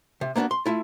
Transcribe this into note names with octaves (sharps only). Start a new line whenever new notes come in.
C3
A#3 B3 D4 F4 F#4
C6
A3 E4 F4